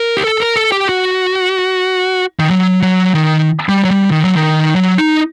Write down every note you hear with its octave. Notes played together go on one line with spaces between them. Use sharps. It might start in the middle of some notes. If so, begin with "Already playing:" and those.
Already playing: A#4
G4
A4
A#4
A4
G4
F#4
D#3
F#3
F#3
D#3
G3
F#3
G3
D#3
F#3
D#3
F#3
D#4